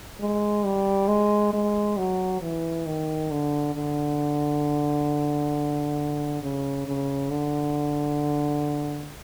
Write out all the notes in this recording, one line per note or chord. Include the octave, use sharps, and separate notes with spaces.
G#3
G3
G#3
G#3
F#3
E3
D#3
D3
D3
C#3
C#3
D3